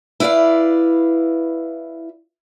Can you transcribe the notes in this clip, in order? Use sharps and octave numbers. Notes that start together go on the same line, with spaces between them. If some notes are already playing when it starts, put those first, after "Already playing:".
E4 B4 D5 E5 F5